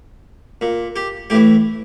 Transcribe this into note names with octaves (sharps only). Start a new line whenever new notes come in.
A#2
G4
A2 E3 G4